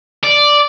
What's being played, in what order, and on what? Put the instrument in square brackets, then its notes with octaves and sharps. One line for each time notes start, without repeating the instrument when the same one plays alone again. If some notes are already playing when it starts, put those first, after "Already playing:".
[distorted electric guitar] D5